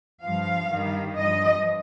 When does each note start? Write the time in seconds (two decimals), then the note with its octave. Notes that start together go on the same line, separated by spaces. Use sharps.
0.24 G2 F3 F5
0.71 G2 D#3 G3
1.18 G2 F3 D#5